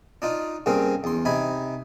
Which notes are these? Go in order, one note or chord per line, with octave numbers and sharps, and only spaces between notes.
D4 D#4 F4
G2 C#3 A#3 C4 C#4
E2 C6
C3 D#4 G#5 B5